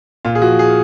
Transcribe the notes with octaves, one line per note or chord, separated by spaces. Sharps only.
A#2 F4
G#4
F3 F#4
G#4